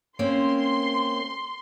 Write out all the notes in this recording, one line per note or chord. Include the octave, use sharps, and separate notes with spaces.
A#3 C4 C#4 C6